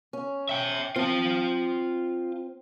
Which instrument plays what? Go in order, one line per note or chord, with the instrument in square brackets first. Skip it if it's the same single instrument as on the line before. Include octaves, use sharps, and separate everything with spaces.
[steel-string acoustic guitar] C#4
[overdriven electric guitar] E5 G5
[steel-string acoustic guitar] C4 [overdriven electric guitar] F4 A5